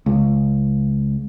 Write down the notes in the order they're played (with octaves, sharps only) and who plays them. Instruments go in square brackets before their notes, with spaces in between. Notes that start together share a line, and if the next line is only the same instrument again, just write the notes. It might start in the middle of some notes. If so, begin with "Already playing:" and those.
[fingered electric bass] C#2